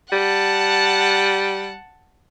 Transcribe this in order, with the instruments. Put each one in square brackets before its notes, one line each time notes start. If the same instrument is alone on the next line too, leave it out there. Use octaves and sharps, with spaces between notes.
[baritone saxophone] G3 [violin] F#5 A5